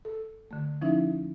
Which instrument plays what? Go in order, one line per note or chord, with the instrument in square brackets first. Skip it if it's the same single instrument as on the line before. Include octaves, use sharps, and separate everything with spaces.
[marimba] A4
D3 A3
F3 C#4 D#4 E4 E5